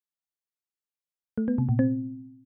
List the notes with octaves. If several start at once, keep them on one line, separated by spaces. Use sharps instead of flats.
A3
B3
C3
A#2
C4